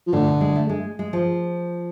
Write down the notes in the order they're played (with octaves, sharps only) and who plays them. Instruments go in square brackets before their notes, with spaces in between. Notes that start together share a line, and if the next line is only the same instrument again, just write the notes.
[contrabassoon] F3
[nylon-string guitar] A2 [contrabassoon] D3
[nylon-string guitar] B2
G#3
A3
G#3
G#3
F3